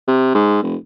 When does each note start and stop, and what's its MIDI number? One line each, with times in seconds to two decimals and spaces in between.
0.07 0.32 48
0.35 0.62 44
0.62 0.76 29